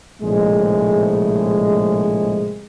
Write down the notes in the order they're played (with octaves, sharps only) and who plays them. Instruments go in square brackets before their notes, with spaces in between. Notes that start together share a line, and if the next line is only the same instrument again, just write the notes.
[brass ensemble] A#1 A2 C3 G#3